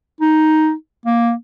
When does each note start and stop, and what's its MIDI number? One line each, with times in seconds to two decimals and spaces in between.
0.21 0.73 63
1.06 1.33 58